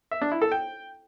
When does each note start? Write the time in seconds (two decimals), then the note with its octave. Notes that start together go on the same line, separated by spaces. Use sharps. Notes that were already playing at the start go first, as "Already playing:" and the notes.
0.11 E5
0.21 D4
0.32 E4
0.42 A4
0.52 G5